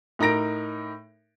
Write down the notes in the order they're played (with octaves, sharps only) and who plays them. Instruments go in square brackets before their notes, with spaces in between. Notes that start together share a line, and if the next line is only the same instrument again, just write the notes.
[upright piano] A2 D#4 A#4 A#6 D7